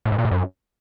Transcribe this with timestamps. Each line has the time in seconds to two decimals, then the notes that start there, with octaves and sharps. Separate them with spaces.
0.05 A2
0.12 G#2
0.18 A#2
0.25 A2
0.31 F#2